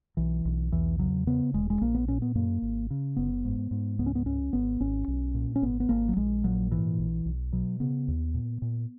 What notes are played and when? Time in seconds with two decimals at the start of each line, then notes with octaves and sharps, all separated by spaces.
0.17 B1 E3
0.45 B1
0.72 E2 E3
0.99 C#3 F#3
1.27 C#3 B3
1.54 E1 G#3
1.70 G#3
1.81 A#1 A#3
1.94 B3
2.08 A#2 C#4
2.22 B3
2.35 F#2 A#3
2.62 G#1
2.90 C#3
3.16 F#1 B3
3.45 G#2
3.71 G#2
3.99 C#2 B3
4.06 C#4
4.15 B3
4.26 C#2 C#4
4.53 G#1 B3
4.80 G#1 C#4
5.08 B1
5.34 A#2
5.56 C#4
5.62 G#1 B3
5.80 B3
5.89 G#1 A#3
6.09 F#3
6.17 A#1 G#3
6.44 A#2 F#3
6.71 G#2 E3
6.99 A#1
7.25 B1
7.52 B2 F#3
7.80 C#3 B3
8.08 D#2
8.34 A#2
8.62 A#2